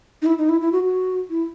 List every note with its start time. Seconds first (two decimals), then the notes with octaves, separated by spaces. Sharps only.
0.22 D#4
0.26 E4
0.38 D#4
0.49 E4
0.61 E4
0.72 F#4
0.84 F#4
1.30 E4